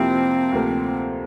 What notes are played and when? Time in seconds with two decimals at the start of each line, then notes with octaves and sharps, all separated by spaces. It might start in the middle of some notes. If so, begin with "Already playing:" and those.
Already playing: F2 C3 F3 A#3 C4 E4
0.52 D2 C3 F3 A#3